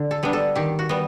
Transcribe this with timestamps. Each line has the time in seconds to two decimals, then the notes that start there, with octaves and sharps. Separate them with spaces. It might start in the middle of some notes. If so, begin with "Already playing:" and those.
Already playing: D3
0.11 A4
0.23 G3 B3 D4
0.33 A4
0.55 D#3 G4
0.79 F#4
0.89 G3 B3